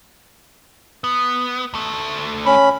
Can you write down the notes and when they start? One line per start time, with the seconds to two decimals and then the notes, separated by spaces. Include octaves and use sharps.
1.04 B3
1.74 D2 A3
2.46 C#4 B5